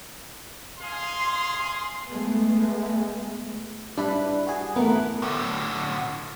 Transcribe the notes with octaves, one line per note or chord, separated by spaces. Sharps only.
G#4 F5 C6
G#3 A3 B3
G3 D4 E4 B4
F#4 G#4
E3 A3 B3 A#4
A2 D3